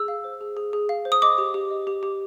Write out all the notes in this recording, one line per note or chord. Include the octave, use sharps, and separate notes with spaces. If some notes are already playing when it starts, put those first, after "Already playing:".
Already playing: G#4 E6
F5
C5
G#4
G#4
G#4
F5
C5
D#6
D#5 D6
G4
G4
D#5
G4
G4